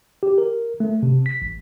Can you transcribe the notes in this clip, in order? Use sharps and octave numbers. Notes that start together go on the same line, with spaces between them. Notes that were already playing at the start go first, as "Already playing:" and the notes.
G4
A#4
A3
C3
B6
A1